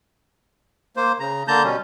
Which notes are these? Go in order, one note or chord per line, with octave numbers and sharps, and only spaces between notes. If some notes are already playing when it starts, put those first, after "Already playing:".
A#3 C5
C#3 A#5
D3 A#3 A5 A#5 G6
B2 G3 C#4